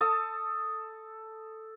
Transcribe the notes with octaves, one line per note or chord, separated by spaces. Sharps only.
A4 A5 D#6